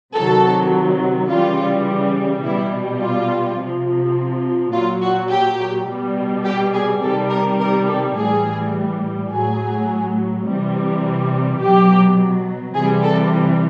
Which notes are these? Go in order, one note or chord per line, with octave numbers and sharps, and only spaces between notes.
C3 D#3 F#3 A4
C#3 E3 G3 F4
B2 G3 E4
F4
C3 F3
A#2 F#3 F4
F#4
G4
B2 G3
G4
G#4
C3 D#3 G3 A4
A#4
A#4
A4
A2 E3 G3 G#4
A2 F#3 G#4
C3 E3 G3
B2 F#3 G4
C3 E3 G3 G#4
A4